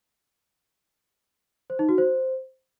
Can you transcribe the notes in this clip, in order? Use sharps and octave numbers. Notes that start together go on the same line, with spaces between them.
C5
D#4
F#4
C5